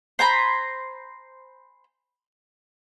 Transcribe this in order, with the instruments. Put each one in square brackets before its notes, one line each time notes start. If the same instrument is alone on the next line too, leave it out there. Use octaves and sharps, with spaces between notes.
[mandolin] C5 G#5 A#5 B5